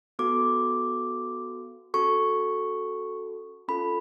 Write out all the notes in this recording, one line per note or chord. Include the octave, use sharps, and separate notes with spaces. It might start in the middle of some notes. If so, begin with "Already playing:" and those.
B3 F#4 A4 D6
C#4 F#4 A4 C#6
C#4 F4 A4 B5